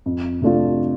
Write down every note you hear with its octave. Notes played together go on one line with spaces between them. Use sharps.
F2
C3 A3 D4 F4